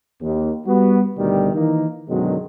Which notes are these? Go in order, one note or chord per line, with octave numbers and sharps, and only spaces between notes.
D#2
G3 B3 F#4
D2 B2 D#3 G3
D#3 E3 A#3 D#4
F#2 B2 D3 D#3 F#3 G#3